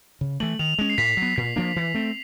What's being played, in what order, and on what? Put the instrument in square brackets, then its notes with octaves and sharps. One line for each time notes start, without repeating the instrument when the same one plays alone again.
[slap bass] C#3
[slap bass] E3 A3 [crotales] F#7
[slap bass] D#3 [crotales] F7
[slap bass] G#3 C#4
[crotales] C7
[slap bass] A2 [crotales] B6
[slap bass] F#3
B3
[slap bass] A#2 [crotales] B6
[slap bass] F3 A#3 D4
E3
A3 C4